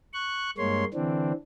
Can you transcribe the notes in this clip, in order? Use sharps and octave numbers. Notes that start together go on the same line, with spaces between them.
C#6 F#6
G2 G#3 A#3 C#5 C6
D3 E3 C4 D4